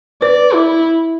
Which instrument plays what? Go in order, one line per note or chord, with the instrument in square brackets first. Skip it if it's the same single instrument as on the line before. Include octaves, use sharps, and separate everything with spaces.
[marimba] B4 [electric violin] D5
[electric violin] E4